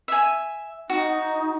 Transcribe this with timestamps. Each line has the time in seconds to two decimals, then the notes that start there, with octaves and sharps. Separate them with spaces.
0.08 E5 G#5
0.90 D#4 F#4